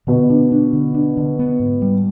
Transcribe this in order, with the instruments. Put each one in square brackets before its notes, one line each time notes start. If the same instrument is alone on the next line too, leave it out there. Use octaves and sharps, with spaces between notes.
[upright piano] B2 [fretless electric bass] D3
[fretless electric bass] D4
D4
D3
D4
D3
B3
G#2
G3